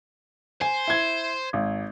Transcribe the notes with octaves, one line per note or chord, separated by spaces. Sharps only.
C5 G#5
E4 G#6
G#1